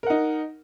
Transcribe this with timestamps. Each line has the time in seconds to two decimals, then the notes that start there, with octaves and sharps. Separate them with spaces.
0.03 A#4
0.07 F#5
0.10 D#4